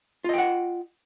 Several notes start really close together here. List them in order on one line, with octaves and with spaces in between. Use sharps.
F4 D#5 G5 F#5